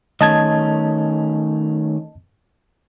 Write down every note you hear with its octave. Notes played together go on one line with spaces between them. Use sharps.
D#3 A3 C#4 D#5 A5 G#6